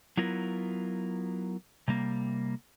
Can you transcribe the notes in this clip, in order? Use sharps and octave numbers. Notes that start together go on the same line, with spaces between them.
F#3 B3 E4 F4 A#4
C3 G3 A#3